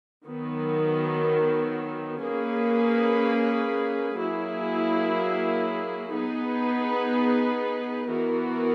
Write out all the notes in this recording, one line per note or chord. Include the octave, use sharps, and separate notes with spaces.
D#3 F#3 B3
A#3 C#4 G#4 B4
F#3 A#3 E4 G#4
B3 D#4 G#4 B4
E3 B3 F#4 A#4